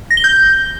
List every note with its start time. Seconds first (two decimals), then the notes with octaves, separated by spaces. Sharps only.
0.11 A#6
0.17 G7
0.24 G6